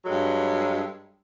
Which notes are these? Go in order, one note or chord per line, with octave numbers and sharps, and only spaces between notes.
G2 F#3 G#3 A4